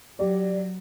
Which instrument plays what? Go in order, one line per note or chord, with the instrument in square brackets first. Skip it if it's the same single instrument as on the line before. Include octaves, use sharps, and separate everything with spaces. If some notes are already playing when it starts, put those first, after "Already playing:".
[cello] F#3 [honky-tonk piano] G4 D5